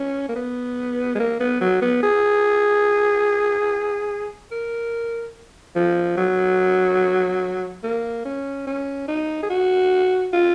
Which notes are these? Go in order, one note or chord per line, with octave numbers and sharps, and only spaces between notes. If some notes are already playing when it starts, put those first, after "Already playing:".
Already playing: C#4
A#3
B3
G#3
A#3
B3
F#3
B3
G#4
A#4
F3
F#3
A#3
C#4
C#4
D#4
G#4
F#4
F4